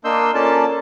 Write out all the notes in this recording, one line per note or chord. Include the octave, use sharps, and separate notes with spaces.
A#3 D4 D#5 C6 E6 G6
A#3 C#4 F4 A4 D5 A5